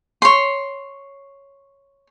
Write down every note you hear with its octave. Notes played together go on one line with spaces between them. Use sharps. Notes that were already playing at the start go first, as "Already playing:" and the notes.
C#5 C6